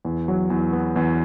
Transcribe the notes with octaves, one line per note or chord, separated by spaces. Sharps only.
E2
F#3
E2
B3
E2